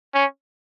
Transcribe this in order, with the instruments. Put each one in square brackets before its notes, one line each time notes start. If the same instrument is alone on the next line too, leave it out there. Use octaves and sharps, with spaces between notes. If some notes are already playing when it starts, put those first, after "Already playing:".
[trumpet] C#4